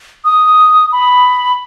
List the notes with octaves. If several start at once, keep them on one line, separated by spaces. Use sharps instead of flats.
D#6
B5